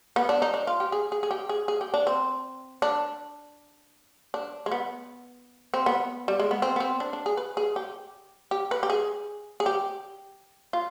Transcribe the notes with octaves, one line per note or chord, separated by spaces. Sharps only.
B3
D4
D#4
D4
F4
G4
G#4
G#4
G#4
G4
G#4
G#4
G4
D4
C4
D4
D4
G#3
B3
C4
B3
G3
G#3
B3
C4
B3
C4
D4
D4
G#4
B4
G#4
G4
G4
B4
G4
G#4
G#4
G4
F4